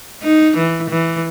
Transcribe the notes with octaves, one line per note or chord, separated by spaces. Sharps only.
D#4
E3
E3